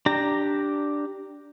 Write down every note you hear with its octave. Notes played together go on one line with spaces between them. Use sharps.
D4 G4 A#5